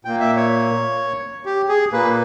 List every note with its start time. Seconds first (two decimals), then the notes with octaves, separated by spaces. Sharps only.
0.05 A#2 A#3 G5
0.20 E5
0.36 C#5
1.45 G4
1.69 G#4
1.93 A#2 A#3 B4